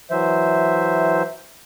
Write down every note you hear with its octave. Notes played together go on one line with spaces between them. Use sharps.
E3 F#3 C5 E5